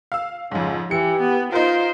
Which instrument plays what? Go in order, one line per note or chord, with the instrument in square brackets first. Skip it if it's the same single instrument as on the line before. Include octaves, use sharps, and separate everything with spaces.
[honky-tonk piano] F5 E6
[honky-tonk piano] F2 G#2 [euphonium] C#3
[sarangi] E3 [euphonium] G4 [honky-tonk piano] C#7
[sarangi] B3
[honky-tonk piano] D#4 A#4 [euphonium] F4 [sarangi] C5